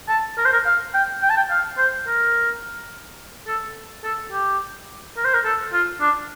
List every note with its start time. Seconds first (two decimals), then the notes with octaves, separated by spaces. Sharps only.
0.09 A5
0.38 A#4
0.45 C5
0.52 A#4
0.66 F5
0.94 G5
1.22 G5
1.30 A5
1.37 G5
1.50 F5
1.78 C5
2.07 A#4
3.47 A4
4.03 A4
4.32 G4
5.17 A#4
5.25 C5
5.34 A#4
5.44 A4
5.73 F4
6.01 D4